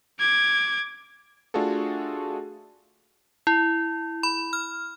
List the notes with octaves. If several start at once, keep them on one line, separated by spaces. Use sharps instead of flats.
D6 G#6
A3 D4 F4 F#4 G#4 A4
E4
B5
F6